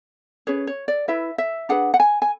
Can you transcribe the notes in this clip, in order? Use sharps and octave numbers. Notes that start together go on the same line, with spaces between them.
C#4 G#4 B4 C#5
C#5
D5
E4 B4 E5
E5
D4 G#4 B4 F#5
F#5
G#5
G#5